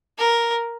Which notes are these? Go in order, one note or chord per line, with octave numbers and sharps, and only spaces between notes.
A#4